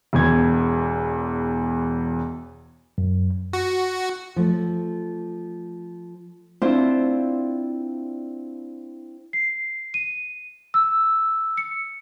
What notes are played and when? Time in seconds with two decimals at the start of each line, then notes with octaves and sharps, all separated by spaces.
0.13 E1 E2 G#6
2.98 F#2
3.53 F#4
4.36 F3 A3
6.62 C4 D4 E4 F4 C5
9.33 C7
9.94 D#7
10.74 E6
11.57 C#7